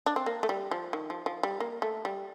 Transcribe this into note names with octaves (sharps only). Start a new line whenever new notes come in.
D4
C4
A#3
A3
G3
F3
D#3
F3
F3
G3
A#3
A3
G3